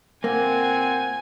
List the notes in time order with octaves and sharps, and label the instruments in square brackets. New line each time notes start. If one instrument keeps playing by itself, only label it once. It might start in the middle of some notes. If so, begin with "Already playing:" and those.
[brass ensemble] A#2 F#5 [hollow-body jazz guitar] A#3 [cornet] C4 [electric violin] G#5